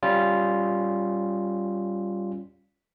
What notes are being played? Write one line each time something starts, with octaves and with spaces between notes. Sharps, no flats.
G3 C#4 F4